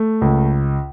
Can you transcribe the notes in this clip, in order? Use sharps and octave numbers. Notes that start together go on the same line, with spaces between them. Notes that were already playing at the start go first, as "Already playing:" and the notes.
Already playing: A3
C#2